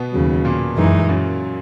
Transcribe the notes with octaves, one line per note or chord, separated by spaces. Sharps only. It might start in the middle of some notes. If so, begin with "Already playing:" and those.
Already playing: B2 B3
D#2 C#3 F#3
A#2 A#3
F#2 E3 G#3 D#4
F#2 F#3